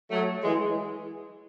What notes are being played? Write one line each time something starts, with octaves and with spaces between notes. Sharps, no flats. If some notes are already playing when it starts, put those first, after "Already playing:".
F#3 A3
E3 G#3